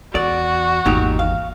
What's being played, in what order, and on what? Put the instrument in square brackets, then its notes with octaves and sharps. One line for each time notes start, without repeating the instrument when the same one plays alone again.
[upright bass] E2 [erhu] F#4 [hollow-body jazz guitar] D5
[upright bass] G#1 E2 [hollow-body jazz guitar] A#2 D#4 G4
[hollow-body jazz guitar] F5